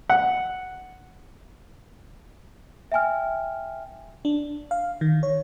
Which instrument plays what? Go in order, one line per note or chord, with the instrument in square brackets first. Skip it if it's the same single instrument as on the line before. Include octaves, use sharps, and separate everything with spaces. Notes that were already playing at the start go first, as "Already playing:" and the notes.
[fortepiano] F#5
[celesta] E5 G5 G#5 F6
[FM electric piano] D4
F5
D#3
C#5